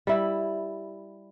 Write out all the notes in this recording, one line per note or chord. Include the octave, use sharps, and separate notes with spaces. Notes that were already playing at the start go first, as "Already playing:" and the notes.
G3 E4